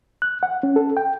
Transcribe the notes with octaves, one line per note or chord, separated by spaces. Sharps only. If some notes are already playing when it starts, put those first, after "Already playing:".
F#6
F#5
C#4
A4
G5